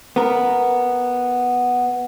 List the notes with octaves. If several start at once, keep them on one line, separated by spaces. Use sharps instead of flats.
B3 A#4